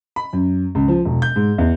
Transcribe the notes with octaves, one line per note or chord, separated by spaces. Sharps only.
B5
F#2
C#2
F3
E1
G6
G#2
E2